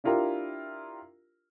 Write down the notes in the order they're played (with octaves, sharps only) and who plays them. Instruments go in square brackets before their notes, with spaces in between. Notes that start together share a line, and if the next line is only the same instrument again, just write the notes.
[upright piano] D4 E4 F4 G4 A#4